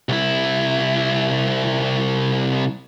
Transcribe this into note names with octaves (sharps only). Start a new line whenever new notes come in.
C2 E4